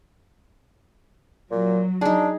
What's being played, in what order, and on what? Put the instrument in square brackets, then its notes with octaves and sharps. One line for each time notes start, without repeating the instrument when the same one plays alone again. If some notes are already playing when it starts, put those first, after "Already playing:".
[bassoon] A#2 [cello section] F#3
[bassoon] D4 [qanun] D#4 G#4